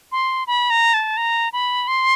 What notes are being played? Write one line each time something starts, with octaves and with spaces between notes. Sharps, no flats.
C6
B5
A#5
A5
A#5
B5
C6